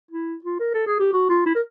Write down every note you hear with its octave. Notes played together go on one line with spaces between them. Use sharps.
E4
F4
A#4
A4
G#4
G4
F#4
F4
E4
A#4